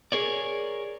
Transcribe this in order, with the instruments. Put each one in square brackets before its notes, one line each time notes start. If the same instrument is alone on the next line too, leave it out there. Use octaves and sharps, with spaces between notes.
[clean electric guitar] G#4 A#4 C#5 D5